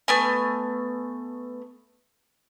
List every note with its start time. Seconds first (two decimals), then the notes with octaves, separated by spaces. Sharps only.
0.08 A3 B3 G#5